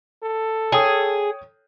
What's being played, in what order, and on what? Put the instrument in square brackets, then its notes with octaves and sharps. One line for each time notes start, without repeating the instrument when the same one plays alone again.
[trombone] A4
[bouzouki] G#4 [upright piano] C#5 G5 D#6